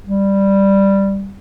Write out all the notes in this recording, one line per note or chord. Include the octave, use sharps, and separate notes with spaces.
G3